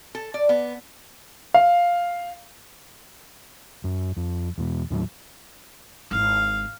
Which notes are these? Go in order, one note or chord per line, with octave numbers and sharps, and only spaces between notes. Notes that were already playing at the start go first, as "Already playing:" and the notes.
A4
D5
B3
F5
F#2
F2
E2 B2
D#2 A2 E3 F#3
G#1 E4 F5